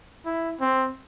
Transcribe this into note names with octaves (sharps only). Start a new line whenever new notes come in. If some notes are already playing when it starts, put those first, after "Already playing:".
E4
C4